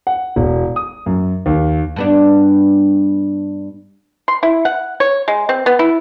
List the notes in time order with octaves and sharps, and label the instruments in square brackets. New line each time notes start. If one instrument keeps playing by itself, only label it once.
[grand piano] F#5
E1
D#6
F#2
D#2
[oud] G2 B3 D4
[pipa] C6
E4
F#5
C#5
G#3
C4
B3
E4